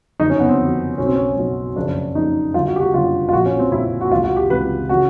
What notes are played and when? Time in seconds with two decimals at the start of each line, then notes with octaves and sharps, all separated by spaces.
0.19 F#1 F2 D3 F#3 D#4
0.30 C#4
0.40 B3
0.49 C4
0.58 F#1 F2 D3 F#3
0.98 B1 B2 F#3 C#4
1.06 C4
1.16 C#4
1.36 B1 B2 F#3
1.76 F#1 F2 C#3 D4
2.15 F#1 F2 C#3 D#4
2.54 G1 F#2 D3 F4
2.67 F#4
2.76 G4
2.81 F#4
2.93 G1 F#2 D3 F4
3.29 F4
3.33 A#1 A#2 F3 F#4
3.46 C#4
3.59 C4
3.72 A#1 A#2 F3 E4
4.01 F#4
4.11 C#2 C3 E3 F4
4.24 F#4
4.36 G4
4.50 C#2 C3 E3 B4
4.89 C#3 E3 F#4